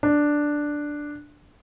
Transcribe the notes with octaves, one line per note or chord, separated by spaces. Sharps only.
D4